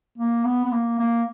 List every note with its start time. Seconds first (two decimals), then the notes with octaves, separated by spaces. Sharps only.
0.18 A#3
0.45 B3
0.65 B3
0.72 A#3
0.99 A#3